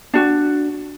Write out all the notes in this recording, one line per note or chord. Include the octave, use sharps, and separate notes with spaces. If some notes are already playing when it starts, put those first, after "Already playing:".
D4 F#4